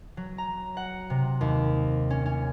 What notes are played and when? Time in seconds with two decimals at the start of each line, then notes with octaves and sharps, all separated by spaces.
0.17 F#3
0.38 A#5
0.77 F#5
1.10 C3
1.41 D#2
2.10 C#4
2.26 C#4